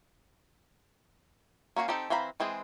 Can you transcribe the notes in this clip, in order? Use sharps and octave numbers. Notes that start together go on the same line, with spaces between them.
A#3 C#4 F#4 F5
C4 D#4 G4 A4
E3 C4 F5 A#5 B5
E3 G#3 C4 G#4